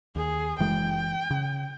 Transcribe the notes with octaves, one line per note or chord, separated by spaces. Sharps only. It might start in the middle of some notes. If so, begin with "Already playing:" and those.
D#2 G#4
F#1 E3 G#3 G5
C#3